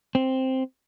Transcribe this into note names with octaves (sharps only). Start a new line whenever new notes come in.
C4